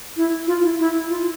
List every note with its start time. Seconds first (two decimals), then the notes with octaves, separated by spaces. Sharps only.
0.17 E4
0.47 F4
0.63 E4
0.79 E4
1.10 F4